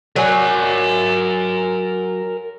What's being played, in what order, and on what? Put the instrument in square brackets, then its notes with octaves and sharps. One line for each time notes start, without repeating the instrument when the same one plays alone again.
[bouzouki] F#3 [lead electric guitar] A#4 G#5